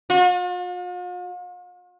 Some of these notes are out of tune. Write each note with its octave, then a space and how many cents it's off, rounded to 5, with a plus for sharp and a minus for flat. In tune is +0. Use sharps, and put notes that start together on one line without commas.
F4 +45